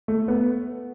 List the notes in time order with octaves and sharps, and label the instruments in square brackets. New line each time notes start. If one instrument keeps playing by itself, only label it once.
[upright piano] A3
B3